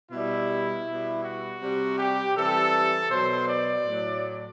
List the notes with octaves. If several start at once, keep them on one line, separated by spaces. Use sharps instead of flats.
B2 G3 E4
B2 G3
F#4
C3 G3
G4
C3 E3 G3 A4
B2 F#3 C5
D5
A2 F#3